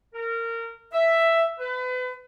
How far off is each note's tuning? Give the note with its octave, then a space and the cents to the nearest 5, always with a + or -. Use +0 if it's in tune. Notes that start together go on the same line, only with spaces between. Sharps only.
A#4 -20
E5 +5
B4 +35